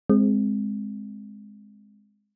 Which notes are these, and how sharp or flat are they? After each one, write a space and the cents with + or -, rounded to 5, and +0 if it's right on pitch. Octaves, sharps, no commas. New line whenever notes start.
G#3 +0 C4 +0